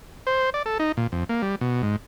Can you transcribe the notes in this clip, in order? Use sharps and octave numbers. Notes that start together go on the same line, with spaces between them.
C5
D5
A4
D#4
A#2
F2
A#3
G3
B2
G#2